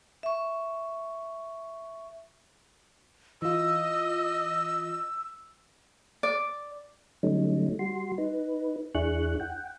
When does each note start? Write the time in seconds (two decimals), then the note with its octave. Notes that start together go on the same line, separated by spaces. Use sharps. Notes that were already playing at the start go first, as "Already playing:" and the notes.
0.23 E5 C#6
3.42 E3 F4 D#5 E6
6.23 D5
7.23 D3 F#3 G3 A3 C#4 D#4
7.79 G3 F#4 C6
8.18 D#4 B4
8.95 E2 D4 E4 G#4 C#6 F#6
9.40 F#5 G5